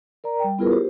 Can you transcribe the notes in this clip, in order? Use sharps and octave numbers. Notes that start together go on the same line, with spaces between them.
A#4 D5 A#5
G3 G5
B3 E4 F4 G#4 A#4 B4
G4 C5